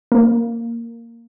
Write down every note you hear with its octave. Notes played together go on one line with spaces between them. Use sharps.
A#3